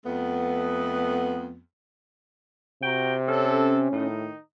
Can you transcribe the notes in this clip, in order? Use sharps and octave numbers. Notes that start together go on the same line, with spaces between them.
F2 A3 B3
C3 F#4 G5 A#5
C#4 A4
A2 D#3 D#4